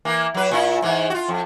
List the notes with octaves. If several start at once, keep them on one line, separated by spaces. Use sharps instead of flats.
E3 A#3
F#3 B4
A#2 E4
G#2 E3
F4 F#4
F2